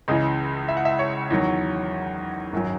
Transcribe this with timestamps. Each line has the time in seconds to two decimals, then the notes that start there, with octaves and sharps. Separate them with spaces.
0.08 C#2 C#3 E3 D#5
0.68 E5
0.77 F#5
0.85 E5
0.99 C#5
1.30 E2 D#3 F#3
2.53 G#1 F#2 D#3 F#3